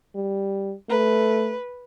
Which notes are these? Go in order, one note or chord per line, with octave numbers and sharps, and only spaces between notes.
G3
A3 B4